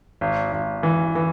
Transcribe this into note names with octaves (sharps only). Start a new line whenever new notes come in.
G#1
G#1
E3
E3